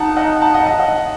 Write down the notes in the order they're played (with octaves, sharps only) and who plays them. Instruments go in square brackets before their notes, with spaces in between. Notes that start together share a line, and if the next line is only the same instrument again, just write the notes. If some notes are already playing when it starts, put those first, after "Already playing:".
Already playing: [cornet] D#4 [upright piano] F#5 A5
[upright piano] D#5 F#5
F#5 A5
D#5 F#5
D#5 F#5
D#5 F#5